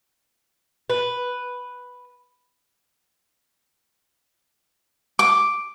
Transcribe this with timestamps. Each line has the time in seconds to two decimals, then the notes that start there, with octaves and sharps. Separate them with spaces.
0.90 B4
5.19 D6